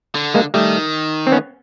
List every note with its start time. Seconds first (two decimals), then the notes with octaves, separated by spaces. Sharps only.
0.15 D3
0.34 G#3 A#3
0.54 D#3 G3 A3
1.27 C4
1.32 B3 C#4